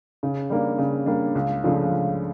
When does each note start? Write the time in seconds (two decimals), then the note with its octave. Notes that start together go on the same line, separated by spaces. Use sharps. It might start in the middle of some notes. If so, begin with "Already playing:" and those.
0.23 C#3
0.50 G3 A#3 D4
0.78 C#3
1.06 G3 A#3 D4
1.35 C#2
1.63 C#3 F3 A3 D4
1.91 C#2